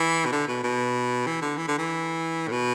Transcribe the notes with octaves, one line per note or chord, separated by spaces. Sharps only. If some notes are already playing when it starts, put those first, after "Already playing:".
Already playing: E3
B2
D3
B2
B2
E3
D3
E3
D3
E3
A2
B2